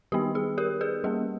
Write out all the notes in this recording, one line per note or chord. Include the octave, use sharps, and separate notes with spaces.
D#3 G3 B3 D#4 G4
G#4
G4 A#4
G#4 B4
G3 A#3 C#4 G#4